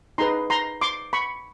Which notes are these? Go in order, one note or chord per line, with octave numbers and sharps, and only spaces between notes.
D#4 G#4 B4 A#5 C6
A#5 C6
C6 D6
B5 C#6